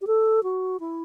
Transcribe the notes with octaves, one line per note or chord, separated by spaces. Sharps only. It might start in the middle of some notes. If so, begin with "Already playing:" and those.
G4
A4
F#4
E4